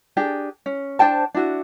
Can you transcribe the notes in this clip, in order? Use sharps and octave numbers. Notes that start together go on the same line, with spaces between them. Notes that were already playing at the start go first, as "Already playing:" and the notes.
D4 G4 G#4
C#4
D4 C5 G5 A5
D4 E4 F#4